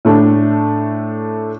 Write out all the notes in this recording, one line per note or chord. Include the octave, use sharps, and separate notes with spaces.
A2 A3 D4